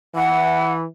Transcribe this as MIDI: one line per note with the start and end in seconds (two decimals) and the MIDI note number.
0.15 0.86 52
0.15 0.73 78